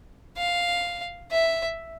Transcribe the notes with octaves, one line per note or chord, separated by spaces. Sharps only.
F5
E5